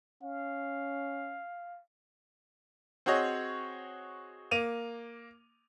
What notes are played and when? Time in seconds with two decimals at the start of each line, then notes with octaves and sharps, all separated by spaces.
0.23 C#4 F5
3.06 C4 F#4 G#4 C#5 D#5
4.51 A#3 D#7 F7